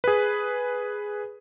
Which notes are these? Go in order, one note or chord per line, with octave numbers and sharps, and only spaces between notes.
G#4 B4